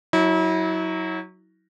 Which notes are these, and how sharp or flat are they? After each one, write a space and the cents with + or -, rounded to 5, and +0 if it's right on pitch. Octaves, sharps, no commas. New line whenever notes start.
F#3 +0 E4 -35